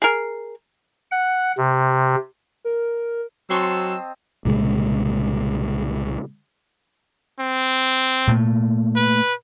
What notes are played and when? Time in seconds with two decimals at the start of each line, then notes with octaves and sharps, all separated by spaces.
0.02 G#4 A#4
1.11 F#5
1.57 C3
2.65 A#4
3.50 F#3 C4 D#5 A5 C6 C#6 E6 C7
4.45 C2 A#2 C#3 G#3
7.39 C4
8.27 A#2 A3
8.96 B4